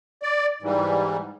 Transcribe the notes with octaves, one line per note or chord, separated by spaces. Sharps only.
D5
G#2 E3 G3